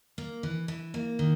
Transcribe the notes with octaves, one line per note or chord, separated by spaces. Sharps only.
A#3
E3
E3
A#3
D#3